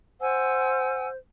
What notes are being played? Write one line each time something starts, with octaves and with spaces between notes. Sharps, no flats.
C5 F#5 G#5 E6